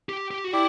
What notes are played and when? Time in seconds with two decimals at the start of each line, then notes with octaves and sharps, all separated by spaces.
0.09 G4
0.31 G4
0.44 F#4
0.52 E4 G4 D5